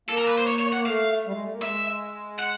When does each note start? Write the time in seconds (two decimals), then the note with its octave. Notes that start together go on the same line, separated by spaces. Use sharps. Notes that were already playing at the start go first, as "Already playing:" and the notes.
0.09 A#3 A4
0.18 A#4
0.28 B4
0.38 C5
0.47 C#5
0.59 C#5
0.73 F#5
0.76 A#3
0.86 A3 F5
1.27 G3
1.33 G#3
1.43 A3
1.52 A#3
1.62 G#3 E5
2.39 F#5